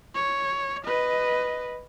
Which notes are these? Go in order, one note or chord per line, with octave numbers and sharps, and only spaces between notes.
C#5
B4 D#5